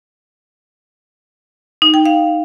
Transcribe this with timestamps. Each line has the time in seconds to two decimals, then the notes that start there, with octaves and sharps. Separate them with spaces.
1.82 D#4
1.94 G5
2.06 F5